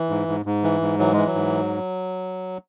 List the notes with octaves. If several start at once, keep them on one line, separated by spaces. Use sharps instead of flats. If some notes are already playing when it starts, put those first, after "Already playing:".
Already playing: E3
G#2
G#2
G#2
E3
G#2
E3 F#3
E3 G#3
F#3
G#2